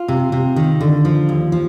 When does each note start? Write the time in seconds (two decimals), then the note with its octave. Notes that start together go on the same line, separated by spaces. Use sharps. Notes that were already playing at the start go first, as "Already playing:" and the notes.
Already playing: F4
0.08 C3
0.32 C3
0.56 D#3
0.81 D3
1.05 F3
1.29 D#2
1.52 F3